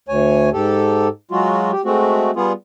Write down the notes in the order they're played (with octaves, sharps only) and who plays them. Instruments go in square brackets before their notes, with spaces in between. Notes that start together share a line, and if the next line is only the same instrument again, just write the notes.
[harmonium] D2 C#5 G#5
G#2 G4 A4
F#3 G#3 F4 F#4
G4
G#3 A3 C4 F#4
G3 B3 F4 G#4